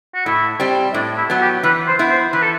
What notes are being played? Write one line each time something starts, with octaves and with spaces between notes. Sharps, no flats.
F#4
A2 E4
G3 C4
A2 D4
E4
F#3 B3
G4
E3 B4
C5
B3 E4
C5
E3 B4
A4